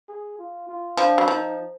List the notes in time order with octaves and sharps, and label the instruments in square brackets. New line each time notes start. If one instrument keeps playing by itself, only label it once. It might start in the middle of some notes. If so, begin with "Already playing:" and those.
[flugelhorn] G#4
F4
F4
[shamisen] F3 [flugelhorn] D4
[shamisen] F#3
[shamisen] F3 [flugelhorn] D#4